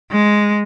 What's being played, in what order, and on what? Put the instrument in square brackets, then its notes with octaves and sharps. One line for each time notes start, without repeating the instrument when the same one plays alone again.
[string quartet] G#3